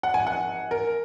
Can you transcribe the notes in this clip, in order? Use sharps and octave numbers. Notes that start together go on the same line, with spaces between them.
F#5
G#5
F#5
A#4